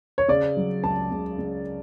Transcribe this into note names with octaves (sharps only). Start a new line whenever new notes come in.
C#5
C#3 D5
F#3
C#2 A5
C#2
C#2